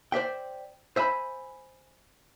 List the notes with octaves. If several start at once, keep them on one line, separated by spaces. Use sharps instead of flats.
C5 D5 E5 G5
C5 E5 G#5 B5